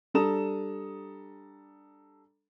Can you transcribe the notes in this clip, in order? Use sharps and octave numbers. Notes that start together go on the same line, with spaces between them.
G3 D4 A4 A#5 D#6 E7